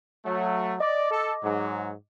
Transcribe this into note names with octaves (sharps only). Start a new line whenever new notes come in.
F#3 A3
D5 D#5 D6
A4
G#2 F#3